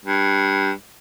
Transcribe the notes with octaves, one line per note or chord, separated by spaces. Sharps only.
G2